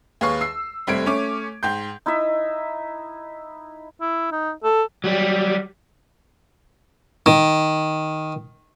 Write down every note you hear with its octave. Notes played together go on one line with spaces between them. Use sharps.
D#2 G#4 B4 C#5 F5 C#6
E6 C7
F1 G3 A3 C4 G#6 D7
A3 C#4 C#5 D6
G#2 G5 C6 G6
D#4 E4 D#5 E5
E4
D#4
A4
F#3 G3
D#3